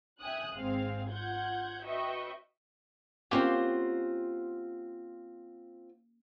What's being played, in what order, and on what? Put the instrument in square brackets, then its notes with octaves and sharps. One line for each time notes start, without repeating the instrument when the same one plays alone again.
[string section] E5 G5 G#5 D#6 F#6
G#1 C4 G#4 F5
F4 F#5 G6 G#6
F#4 B4 D#5 E5 G5 C#6
[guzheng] A#3 C#4 G4 [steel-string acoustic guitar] C4 F4 F#5